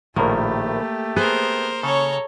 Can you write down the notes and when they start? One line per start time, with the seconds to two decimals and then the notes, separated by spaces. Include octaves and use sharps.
0.16 A#1 A2 D#3 A3 A#3 G4
1.16 B3 G#4 A#4 C5
1.83 C#3 A4 C#5 A#5